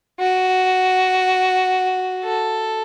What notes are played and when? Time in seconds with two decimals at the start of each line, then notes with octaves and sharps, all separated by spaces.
0.20 F#4
2.24 A4